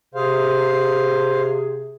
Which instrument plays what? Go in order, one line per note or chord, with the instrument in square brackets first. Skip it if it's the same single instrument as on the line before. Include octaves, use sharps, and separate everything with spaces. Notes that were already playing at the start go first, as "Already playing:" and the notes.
[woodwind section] C3 G#4 [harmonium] C5 F5